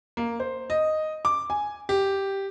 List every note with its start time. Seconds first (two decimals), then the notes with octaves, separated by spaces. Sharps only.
0.17 A#3
0.40 C5
0.70 D#5
1.25 D6
1.50 G#5
1.89 G4